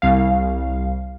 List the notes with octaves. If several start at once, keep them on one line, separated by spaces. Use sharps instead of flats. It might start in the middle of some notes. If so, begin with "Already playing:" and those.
C2 F5